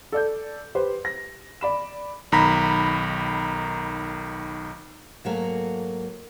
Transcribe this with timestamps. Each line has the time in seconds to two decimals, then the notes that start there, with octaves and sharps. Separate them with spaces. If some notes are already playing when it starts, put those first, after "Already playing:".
0.12 A4 D5 G6
0.75 G4 B4 C5
1.05 A#6
1.61 D5 B5 E7
2.32 B1 D#3 A#5 B5 B6
5.24 G#2 F#3 A3 A#3 F#4 A#4